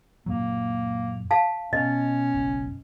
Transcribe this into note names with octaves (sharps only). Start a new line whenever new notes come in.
F#2 A#2 F#3 A#3
F5 A5
B2 C#4 D#5
F#1 B1